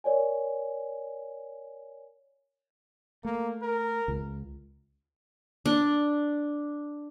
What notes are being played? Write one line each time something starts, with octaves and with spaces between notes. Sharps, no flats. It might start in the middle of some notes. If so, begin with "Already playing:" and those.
A#4 C#5 D5 G#5
A3 A#3
A#4
C#2
D4